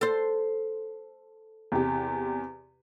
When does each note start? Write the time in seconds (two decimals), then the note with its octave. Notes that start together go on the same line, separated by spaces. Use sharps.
0.01 A4 C5
1.72 E2 C3 G4